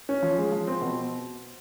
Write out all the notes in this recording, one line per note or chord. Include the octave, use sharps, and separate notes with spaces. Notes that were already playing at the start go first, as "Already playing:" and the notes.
C#4
F3
G#3
F3
C4
B2